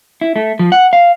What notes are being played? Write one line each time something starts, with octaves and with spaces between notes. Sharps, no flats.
E4
A3
F3
F#5
F5